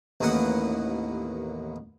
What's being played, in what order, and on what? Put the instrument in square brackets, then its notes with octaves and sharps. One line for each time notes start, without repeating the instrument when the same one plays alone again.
[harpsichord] A1 D#2 A#3 B3 F#5